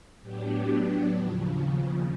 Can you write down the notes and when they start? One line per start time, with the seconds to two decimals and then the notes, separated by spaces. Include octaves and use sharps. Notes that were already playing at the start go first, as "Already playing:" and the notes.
0.21 A2 F#3 B3 D4 G4
1.13 D#2 C#3 F3